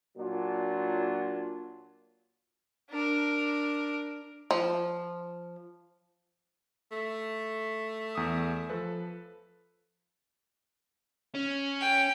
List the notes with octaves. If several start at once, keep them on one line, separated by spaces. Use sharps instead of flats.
A#2 F#3 D4 F4
D4 A#4
F3
A3
E2 D#6
F3 A4 B4
C#4
G5